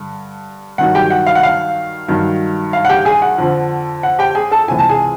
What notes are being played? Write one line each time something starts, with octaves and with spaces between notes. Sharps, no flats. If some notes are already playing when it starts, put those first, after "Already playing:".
Already playing: G2 D3
G2 D#3 F#3 F#5
G4 G5
F#5
F5
F#5
F5
G2 D#3 F#3
F5
F#5
G4 G5
G#4 G#5
F#5
F2 D3 F3
F#5
G4 G5
G#4 G#5
A4 A5
C#2 C3 E3 G#5
A5
G#4 G#5